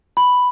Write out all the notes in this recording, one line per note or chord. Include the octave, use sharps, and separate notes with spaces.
B5